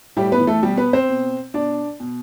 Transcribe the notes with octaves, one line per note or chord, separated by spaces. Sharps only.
A2 G3 G4
B3 B4
E3
A3 A4
B2 G3 G4
B3 B4
C4 C5
B2
B2 D4 D5
B2